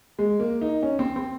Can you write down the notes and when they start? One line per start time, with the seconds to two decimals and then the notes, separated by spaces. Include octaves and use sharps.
0.19 G#3
0.40 A#3
0.61 D#4
0.83 C#4
0.99 C4
1.16 C4